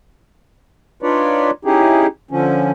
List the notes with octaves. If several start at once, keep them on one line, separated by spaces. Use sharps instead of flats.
D4 D#4 F4 B4 C#5 D5
C#4 D#4 E4 G4 G#4
D3 F3 C#4